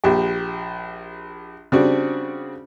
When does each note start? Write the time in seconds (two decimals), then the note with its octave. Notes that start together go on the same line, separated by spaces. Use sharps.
0.04 A#1 G4
1.72 C#3 G3 C4 D4 F#4